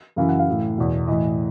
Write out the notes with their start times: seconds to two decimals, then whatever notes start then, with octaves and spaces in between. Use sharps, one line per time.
0.16 F#2 C#3 E3 F5
0.29 F#5
0.39 F5
0.47 A2 E3
0.77 E2 B2
1.07 A2 E3 D#5